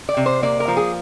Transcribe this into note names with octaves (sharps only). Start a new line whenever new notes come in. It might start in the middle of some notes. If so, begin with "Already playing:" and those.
D5
C3
C5
A#3 D5
A#4
F3
G#4